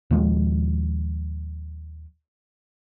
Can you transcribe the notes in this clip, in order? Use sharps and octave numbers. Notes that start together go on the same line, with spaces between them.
D#2 A#2 F3 G#3